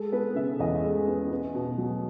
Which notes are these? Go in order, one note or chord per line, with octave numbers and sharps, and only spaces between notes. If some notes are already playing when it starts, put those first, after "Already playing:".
Already playing: G#3 A4
B3 B4
C#3 E5
E2 D#5
G#3
B3
B3
B2
F#3